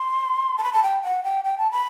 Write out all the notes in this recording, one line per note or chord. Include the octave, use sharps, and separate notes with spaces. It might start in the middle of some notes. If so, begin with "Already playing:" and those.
Already playing: C6
A5
B5
A5
G5
F#5
G5
G5
A5
B5